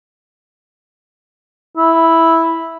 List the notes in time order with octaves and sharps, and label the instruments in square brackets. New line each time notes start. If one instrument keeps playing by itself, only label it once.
[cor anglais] E4